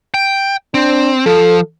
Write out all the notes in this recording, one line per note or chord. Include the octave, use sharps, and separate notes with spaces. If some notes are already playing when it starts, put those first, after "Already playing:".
G5
C4 D4
F3 A4